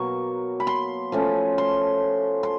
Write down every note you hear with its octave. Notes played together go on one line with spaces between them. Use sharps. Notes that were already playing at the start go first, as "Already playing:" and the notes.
Already playing: B2 F#3 A#3 C#6
B5
C6
F3 A3 C#4
C6
C6